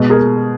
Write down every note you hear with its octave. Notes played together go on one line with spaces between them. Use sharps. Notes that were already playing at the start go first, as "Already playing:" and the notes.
Already playing: B2 G#3
G#4 A#4